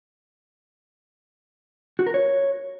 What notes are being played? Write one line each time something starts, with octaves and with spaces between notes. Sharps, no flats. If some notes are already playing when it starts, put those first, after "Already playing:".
F#4
A#4
C#5